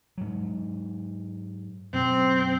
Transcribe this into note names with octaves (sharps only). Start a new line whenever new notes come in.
G#2 F#3
F#2 B2 C4